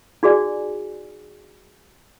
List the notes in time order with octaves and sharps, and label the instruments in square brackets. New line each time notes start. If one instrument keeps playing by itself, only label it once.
[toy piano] D#4 F#4 G#4 D5 G#5